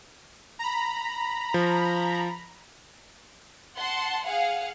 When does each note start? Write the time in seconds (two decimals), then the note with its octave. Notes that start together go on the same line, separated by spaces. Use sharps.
0.59 A#5 B5
1.54 F3
3.76 F#5 A5 C6
4.25 G#4 F5 F#5